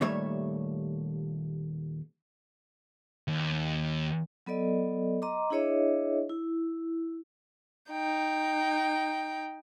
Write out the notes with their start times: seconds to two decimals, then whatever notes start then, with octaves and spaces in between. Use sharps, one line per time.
0.01 D#2 A#2 G3 A3 C#5 E5
3.28 D#2
4.46 F#3 B3 A4 D5 D#5
5.22 D#5 A#5 C6 D6
5.50 D4 E4 G#4 C#5 D#5 E5
6.29 E4
7.91 D#4 G5